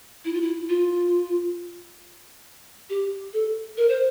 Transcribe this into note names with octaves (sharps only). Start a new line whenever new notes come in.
E4
F4
E4
F4
G4
A4
A#4
C5